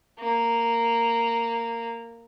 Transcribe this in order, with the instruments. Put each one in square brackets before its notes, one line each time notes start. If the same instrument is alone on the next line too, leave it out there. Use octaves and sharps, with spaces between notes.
[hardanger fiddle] A#3